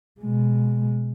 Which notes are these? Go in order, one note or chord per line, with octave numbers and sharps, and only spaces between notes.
B2 G#3